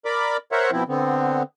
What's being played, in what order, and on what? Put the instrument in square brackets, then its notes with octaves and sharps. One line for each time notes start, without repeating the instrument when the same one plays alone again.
[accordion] A#4 D5 B5 D6
A#4 C5 C#5 E5 F#5
B2 F3 C4 E4
D3 B3 C4